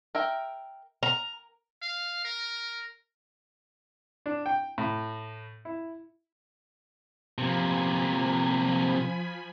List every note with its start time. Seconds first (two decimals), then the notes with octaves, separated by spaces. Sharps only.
0.15 A#4 E5 G5
1.03 A#4 A#5
1.82 F5
2.25 A#4
4.26 D4
4.46 G5
4.78 A2
5.65 E4
7.38 C3 F3 A#3 G#5 B5